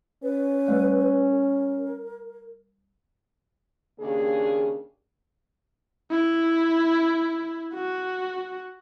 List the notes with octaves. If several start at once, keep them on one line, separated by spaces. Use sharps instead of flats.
C#4 B4
G3 A3 D5
A#4
D#2 C#3 A#3 D4 G#4
E4
F#4